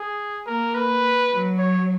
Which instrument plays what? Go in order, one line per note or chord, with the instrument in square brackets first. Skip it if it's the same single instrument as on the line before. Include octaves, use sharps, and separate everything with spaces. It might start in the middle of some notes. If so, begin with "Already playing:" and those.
Already playing: [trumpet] G#4
[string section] A#3 [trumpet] A#4
[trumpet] B4
[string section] F#3
[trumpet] C#5